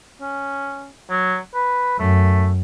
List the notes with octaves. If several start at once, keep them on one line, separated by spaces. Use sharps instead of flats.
C#4
F#3
B4
F#2 A3